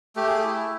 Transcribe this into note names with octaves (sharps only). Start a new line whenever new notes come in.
A3 G4
G#4
G4
E4